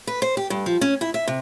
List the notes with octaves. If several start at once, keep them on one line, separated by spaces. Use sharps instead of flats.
B4
C5
G4
G2
F3
C#4
E4
E5
C3